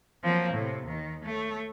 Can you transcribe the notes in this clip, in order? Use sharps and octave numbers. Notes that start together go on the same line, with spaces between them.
F3 F#3 A#3 C4
A2 C3
D#2 D#3
A3 C#5